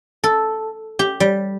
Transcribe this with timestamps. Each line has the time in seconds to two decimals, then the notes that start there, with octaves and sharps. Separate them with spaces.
0.24 A4
0.99 G4
1.20 G3